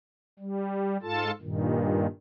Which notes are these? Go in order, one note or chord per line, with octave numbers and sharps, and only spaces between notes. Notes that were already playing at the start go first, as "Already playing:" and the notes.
G3
G#2 F4 A4 A5
G2 A#2 D#3